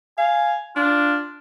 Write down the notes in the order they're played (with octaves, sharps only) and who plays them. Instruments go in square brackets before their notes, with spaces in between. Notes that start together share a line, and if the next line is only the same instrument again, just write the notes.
[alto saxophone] F5 [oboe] G#5
[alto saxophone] D4 [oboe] F4